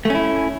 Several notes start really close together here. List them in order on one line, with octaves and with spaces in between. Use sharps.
A3 C#4 E4